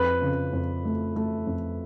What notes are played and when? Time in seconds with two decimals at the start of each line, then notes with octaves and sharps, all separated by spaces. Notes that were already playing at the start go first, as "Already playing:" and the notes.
Already playing: F2 B4
0.22 C#3
0.53 F2
0.85 A3
1.16 A3
1.47 F2